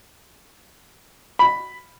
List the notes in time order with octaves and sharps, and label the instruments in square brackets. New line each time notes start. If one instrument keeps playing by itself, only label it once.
[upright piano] B5